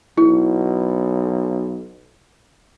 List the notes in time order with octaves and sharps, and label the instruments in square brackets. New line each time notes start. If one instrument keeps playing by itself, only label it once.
[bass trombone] B1 [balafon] E4